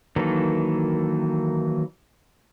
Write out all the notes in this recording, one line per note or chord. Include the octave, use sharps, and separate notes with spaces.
D#3 E3 F#3 A#3 A4